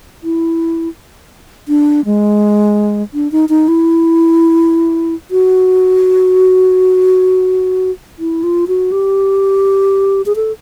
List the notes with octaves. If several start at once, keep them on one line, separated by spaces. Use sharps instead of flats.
E4
D4
G#3
D4
D#4
D#4
E4
F#4
E4
F4
F#4
G4
G#4
A4